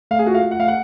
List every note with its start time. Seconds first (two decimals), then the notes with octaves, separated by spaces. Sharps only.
0.11 A3 F5
0.19 G#4
0.26 F4 F#4
0.34 F5
0.43 A3
0.51 F#5
0.59 A3 F5
0.68 F#5